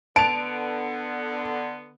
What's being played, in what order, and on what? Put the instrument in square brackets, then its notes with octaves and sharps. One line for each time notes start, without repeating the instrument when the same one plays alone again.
[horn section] D3 B3 [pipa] A5 [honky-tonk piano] D7 F7